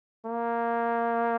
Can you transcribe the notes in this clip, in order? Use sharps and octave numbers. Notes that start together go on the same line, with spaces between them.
A#3